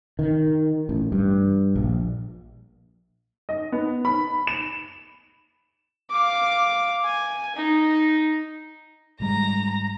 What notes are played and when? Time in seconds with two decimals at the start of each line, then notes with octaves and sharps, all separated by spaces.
0.19 D#3
0.89 A1
1.12 G2
1.76 A#1
3.49 D#5
3.72 B3
4.05 B5
4.47 E7
6.10 F5 D6
7.04 G#5
7.56 D#4
9.20 G#1 G3 G#3 A#5